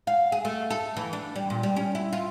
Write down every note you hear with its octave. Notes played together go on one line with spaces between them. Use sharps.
F5
G#4
A3
A4
E3
D4
G3
A#2
G3
C#4
E4
F4